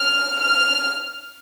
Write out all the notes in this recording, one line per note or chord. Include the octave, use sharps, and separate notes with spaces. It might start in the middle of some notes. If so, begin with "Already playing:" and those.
Already playing: F6
F6